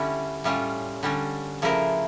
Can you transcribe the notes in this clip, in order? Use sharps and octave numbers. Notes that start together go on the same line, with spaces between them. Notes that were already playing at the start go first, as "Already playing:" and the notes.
Already playing: D3 G3 C#4 E4
A2 G3 C#4 F4
D3 G3 C#4
C#3 F3 A3 E4 A#4